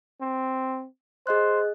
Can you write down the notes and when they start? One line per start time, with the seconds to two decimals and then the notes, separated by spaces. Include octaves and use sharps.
0.21 C4
1.27 G#4 C5 D#5 F#6